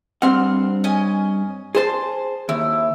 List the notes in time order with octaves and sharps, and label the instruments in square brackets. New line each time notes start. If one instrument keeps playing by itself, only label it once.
[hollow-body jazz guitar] G2 C4 F#5 [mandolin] F6
[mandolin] C#4 D#5 G#5
[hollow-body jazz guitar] G#4 C5 [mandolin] A5 C6
[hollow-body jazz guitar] D#2 [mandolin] E4